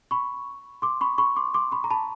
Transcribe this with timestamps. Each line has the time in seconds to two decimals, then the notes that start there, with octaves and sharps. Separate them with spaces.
0.11 B5 C#6
0.82 C6 D6
1.01 B5 C#6
1.18 B5 C#6
1.36 C6 D6
1.54 C6 D6
1.72 B5 C#6
1.84 A#5
1.90 A5 B5